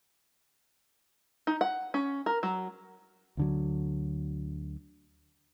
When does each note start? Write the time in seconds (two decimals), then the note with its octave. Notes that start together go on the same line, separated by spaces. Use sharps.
1.47 D#4
1.61 F#5
1.94 C#4
2.26 A#4
2.43 F#3
3.37 D2 D3 F#3